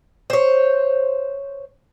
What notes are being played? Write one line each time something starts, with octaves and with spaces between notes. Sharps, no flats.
C5 C#5